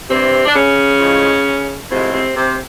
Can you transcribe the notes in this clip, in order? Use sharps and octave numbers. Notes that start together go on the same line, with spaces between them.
G2 C3 E3 G3 C4
D4
C#3 C#4
A2 F3 G#3
A2 C3 F3 G#3 C4
C3 C4
C3 C4